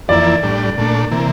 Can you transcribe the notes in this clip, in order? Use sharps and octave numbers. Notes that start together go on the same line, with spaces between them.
F2 E3 A#3 E4 D5
A2 G3 D4
A#2 A3 D4
C3 E3 A#3